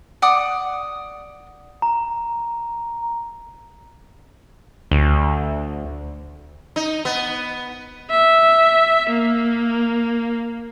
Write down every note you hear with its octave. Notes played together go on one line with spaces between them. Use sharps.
D5 F#5 D#6
A#5
D2
D#4
B3
E5
A#3